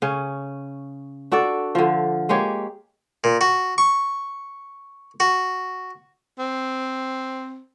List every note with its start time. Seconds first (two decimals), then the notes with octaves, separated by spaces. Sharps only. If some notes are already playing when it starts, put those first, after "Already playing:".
0.02 C#3 C#4
1.32 D4 F#4 A4 D5
1.75 D3 F3
2.29 G#3 A#3 G4 C#5
3.24 A#2
3.41 F#4
3.78 C#6
5.20 F#4
6.39 C4